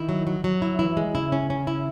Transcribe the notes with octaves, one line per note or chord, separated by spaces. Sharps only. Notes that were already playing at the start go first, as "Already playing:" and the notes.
Already playing: D#3 E4
F#3
F#3
F#3
E4
E3 E4
G#3
C#3 E4
C#4
C#4
E4